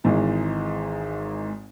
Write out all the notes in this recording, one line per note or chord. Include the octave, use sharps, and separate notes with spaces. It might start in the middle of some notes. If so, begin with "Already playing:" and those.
G#1 G#2 E3